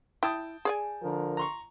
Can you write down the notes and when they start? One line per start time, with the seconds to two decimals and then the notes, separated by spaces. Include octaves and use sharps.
0.23 E4 G5 A5 D#6
0.65 G#4 D5 G#5
1.03 D3 F3 A#4
1.37 A#5 C6 C#6